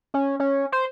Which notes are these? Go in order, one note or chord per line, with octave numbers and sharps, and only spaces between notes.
C#4
C#4
C5